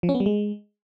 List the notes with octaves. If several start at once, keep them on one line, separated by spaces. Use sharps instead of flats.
F3
C#4
B3
G3
G#3